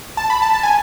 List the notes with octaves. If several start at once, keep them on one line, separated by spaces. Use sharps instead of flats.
A5
B5
A5
A5
G#5